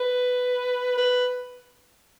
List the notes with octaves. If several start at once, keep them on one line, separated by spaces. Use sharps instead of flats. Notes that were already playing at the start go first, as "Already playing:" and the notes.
Already playing: B4
B4